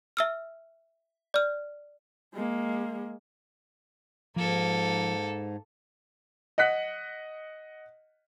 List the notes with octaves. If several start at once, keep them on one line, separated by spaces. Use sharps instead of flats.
E5 E6 F6
D5 F6
G#3 A#3
G#2 F3 A#3 A4
D#5 F#5 F#6 B6